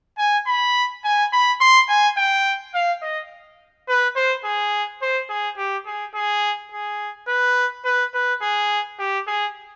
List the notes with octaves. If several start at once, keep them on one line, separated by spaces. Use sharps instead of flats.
G#5
B5
G#5
B5
C6
G#5
G5
F5
D#5
B4
C5
G#4
C5
G#4
G4
G#4
G#4
G#4
B4
B4
B4
G#4
G4
G#4